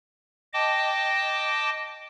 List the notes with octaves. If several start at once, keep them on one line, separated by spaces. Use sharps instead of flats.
D#5 G5 A5 D6